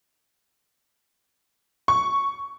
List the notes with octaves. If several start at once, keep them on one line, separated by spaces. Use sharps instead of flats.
C#6